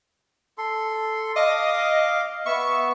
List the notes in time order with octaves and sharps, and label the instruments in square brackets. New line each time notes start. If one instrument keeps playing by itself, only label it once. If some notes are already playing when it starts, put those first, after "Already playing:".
[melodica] A4 C6
[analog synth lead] D#5 [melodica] F5 D6
[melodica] B3 E5 [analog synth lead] C#6